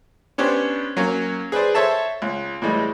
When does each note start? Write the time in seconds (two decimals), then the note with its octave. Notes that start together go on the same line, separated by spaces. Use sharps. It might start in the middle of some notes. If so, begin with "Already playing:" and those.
0.38 B3 C#4 D4 G4 C5
0.97 F#3 A#3 C#4
1.52 G#4 B4 C5 D5
1.75 A4 C5 C#5 E5 A5
2.22 C#2
2.62 A2 E3 G3 G#3